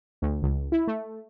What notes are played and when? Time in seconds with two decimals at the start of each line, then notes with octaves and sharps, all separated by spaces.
0.22 D2
0.43 C#2
0.72 E4
0.87 A3